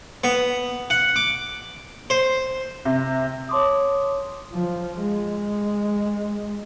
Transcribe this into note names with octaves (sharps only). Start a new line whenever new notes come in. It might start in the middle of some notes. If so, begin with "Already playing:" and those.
B3
F#5
D6
C5
C3
C#5 A5 C6 D6 D#6
F3
G#3